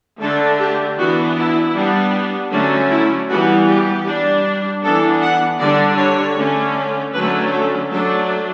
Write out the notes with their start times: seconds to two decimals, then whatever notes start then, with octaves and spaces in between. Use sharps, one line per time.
0.21 D3 A3 D4 A4
0.59 G4
0.98 E3 B3 D4 F#4
1.38 E4
1.76 G3 B3 D4
2.52 D3 F#3 A3 C#4 D4
2.91 E4
3.29 E3 G3 B3 F#4
3.68 G4
4.06 G3 D4
4.82 E3 B3 D4 A4
5.21 F#5
5.60 D3 G3 D4 D5
5.98 C#5
6.36 D3 A3 C#4
7.14 D3 F#3 A3 C#4 B4
7.52 A4
7.91 F#3 A3 D4 A4